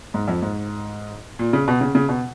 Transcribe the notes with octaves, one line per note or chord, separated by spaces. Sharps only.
G#2
F2
G#2
A#2
C#3
B2
C#3
C#3
B2